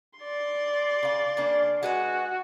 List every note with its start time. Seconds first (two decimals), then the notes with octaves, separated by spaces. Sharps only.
0.19 D5 C6
1.03 C#3 F5
1.37 C#3 A#3 D4
1.83 G#3 F#4 B4 G#5